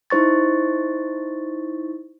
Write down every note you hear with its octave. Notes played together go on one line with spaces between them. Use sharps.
D#4 E4 C5 C#6 A6